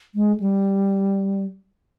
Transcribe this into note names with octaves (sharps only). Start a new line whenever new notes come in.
G#3
G3